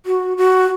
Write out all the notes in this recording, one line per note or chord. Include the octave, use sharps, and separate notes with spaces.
F#4
F#4